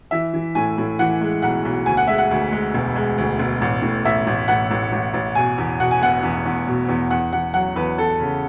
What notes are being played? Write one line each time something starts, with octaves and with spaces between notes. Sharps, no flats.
E3 E5
E3
A2 G#5
A2
E3 F#5
G#3
B1 F#5
B1
D2 G#5
F#5
G#3 E5
F#5
D2
G#3
E1
G#3
D2
E1
A1
A2
A1 E5
A1
A1 F#5
A1
A1
A1
B2 G#5
E2
B2 F#5
G#5
E1 F#5
E2
E2
B2
E2
E2 F#5
E2 F#5
F#3 F#5
E2 B4
E2 A4
C#3